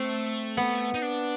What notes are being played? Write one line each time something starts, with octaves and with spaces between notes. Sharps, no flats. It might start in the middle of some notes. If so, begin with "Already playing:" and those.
Already playing: A3 C4
B3
D#4
D4